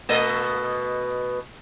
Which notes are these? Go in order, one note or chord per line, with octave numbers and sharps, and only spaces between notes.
B2 A3 D#5